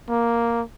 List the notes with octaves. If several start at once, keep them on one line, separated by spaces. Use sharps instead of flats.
A#3